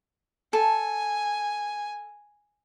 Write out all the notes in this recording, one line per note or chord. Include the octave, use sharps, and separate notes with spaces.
A4 G#5